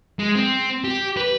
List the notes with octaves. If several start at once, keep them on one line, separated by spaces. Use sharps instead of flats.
G#3
C4
G4
B4